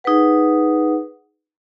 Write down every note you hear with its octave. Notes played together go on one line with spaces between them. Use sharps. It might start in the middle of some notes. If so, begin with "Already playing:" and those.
D#4 G#4 B4 F#5